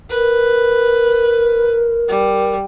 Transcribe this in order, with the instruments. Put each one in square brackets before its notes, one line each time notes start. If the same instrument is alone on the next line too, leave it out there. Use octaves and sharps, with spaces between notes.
[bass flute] A#4 [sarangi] B4
[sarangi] G3